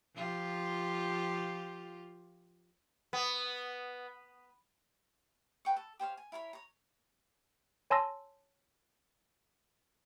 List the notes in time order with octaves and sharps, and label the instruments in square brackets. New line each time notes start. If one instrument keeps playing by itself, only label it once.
[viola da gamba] F3 F4 G4
[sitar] B3
[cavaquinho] B4 G5 C#6
A4
G4 C5 C#5 F5
G#5
E4 A#4 C#5 B5
C#5 A#5
[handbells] C#5 G#5 A5 C6 E6 A#6